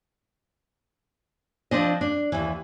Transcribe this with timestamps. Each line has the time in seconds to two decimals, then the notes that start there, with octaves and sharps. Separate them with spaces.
1.71 F3 C4 D4 D#5
2.01 D4
2.32 D#2 E3